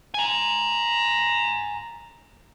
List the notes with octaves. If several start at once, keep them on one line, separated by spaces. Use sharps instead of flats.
G#5 A#5